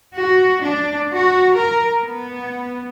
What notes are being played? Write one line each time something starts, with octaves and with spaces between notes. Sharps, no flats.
F#4
D4
F#4
A#4
B3